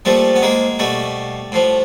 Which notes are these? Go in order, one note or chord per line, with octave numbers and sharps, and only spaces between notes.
A#2 F3 G3 A3
B3
G#3 A#3
B2 G3 A3
A2 F3